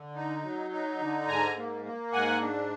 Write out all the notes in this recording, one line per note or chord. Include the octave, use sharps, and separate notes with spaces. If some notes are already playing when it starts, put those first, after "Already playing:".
Already playing: D3
D#4
F#3
D#4
D3
G#2 G#5 A#5
A#3
A#3
G#2 F#5 G#5
D4